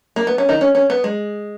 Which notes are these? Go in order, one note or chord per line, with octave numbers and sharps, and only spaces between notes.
A#3
B3
C#4
D#3 D#4
C#4
C#4
B3
G#3